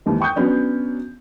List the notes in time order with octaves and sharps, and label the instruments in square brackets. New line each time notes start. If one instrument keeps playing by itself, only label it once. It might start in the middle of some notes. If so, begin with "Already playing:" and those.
[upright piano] D#2 G#2 E3
G5 C#6 D#6 G6
F#3 B3 C#4 D4